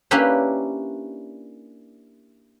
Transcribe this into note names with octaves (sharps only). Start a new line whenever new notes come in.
A#3 C#4 D4 E4 G4 B4